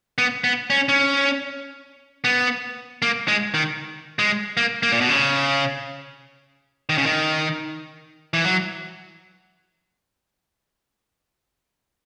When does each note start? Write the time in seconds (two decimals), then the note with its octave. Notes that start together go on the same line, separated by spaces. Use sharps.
0.18 B3
0.44 B3
0.70 C#4
0.89 C#4
2.24 B3
3.02 A#3
3.28 G#3
3.54 D#3
4.19 G#3
4.57 A#3
4.83 A#3
4.92 A#2
5.00 B2
5.09 C#3
6.89 D#3
6.98 C#3
7.06 D#3
8.34 E3
8.44 F#3